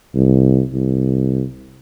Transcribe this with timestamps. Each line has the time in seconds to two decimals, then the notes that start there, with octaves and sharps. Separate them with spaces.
0.15 C2
0.73 C2